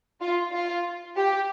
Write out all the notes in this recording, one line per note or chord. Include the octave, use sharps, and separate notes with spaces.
F4
F4
G4